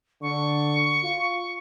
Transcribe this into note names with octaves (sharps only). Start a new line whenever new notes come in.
D3 C#6
F4